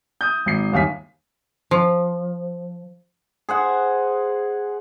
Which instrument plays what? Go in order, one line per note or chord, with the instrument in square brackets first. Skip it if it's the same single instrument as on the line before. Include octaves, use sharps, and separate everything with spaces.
[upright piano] D#6 G6
G#1 C7
G1 D#2 F5 G#5 B6
[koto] F3
[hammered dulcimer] G#4 C5 F#5